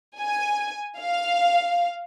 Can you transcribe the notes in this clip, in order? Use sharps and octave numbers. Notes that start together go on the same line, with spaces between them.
G#5
F5